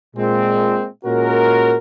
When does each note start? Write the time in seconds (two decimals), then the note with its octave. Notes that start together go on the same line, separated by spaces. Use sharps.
0.15 A#2 G#3 C4
1.05 A#2 G#3 C#4 F#4 A#4